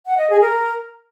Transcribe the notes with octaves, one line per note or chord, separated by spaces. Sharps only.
F#5
D#5
G#4
A#4